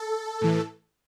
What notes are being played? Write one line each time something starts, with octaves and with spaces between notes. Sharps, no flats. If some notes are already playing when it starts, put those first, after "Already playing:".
Already playing: A4
A2 E3